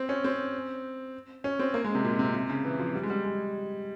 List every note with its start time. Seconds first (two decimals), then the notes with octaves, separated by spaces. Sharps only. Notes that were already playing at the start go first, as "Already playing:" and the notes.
Already playing: C4
0.09 C#4
0.24 C4
1.44 C#4
1.59 C4
1.74 A#3
1.84 G#3
1.95 C3
2.04 A#2
2.19 C3
2.35 C3
2.50 C#3
2.65 E3
2.80 F3
2.95 G3
3.03 G#3
3.10 G3
3.25 G#3